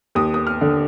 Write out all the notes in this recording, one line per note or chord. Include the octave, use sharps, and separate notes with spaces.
D#2 D#6
D#6
F6
D3